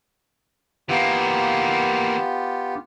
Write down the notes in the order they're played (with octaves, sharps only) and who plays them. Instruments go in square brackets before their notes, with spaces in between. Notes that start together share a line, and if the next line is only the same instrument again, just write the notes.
[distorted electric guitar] E3 A#3 [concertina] B3 F4 G4